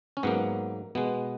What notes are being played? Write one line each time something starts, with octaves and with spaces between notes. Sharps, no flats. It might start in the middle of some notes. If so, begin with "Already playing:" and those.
C#4
G#2 F#3 A#3 B3
B2 G#3 B3